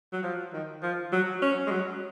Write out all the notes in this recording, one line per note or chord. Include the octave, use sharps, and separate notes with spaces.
F#3
F3
D#3
F3
F#3
C#4
G#3
F#3